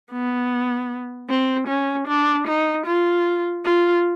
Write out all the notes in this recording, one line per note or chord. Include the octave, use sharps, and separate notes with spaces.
B3
C4
C#4
D4
D#4
F4
F4